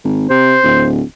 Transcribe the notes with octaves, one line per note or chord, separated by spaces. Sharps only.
G#1
C3 C5
D1